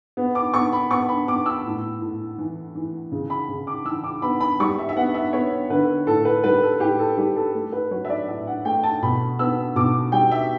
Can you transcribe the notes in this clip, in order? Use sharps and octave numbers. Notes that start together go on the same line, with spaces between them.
B3
D6
B3 C#6
B5
B3 C#6
B5
B3 D6
E6
A2
A2
E3
E3
C#3
B5
C#3
D6
E3 E6
D6
B3 B5
B5
G3 C#6
E5
E5
B3 F#5
E5
B3 C#5
D3 B4
A2 A4
B4
G3 B4
A4
A2 G4
A4
G3 G4
A4
A3
B4
F#3 C#5
E5
D5
A2 E5
F#5
A3 G5
A5
B2 B5
B3 E6
B2 D6
G3 G5
E5